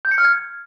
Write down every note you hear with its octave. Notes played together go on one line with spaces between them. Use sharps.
G6
C#7
F6
G#6